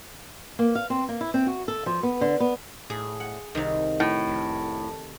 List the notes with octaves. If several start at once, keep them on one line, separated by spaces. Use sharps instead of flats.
A#3
F5
C4
A#3
E4
C4
F#4
A4
F3
B3
D3
B3
A2 G#4
F#5
C2 C3 D#3
A2
F1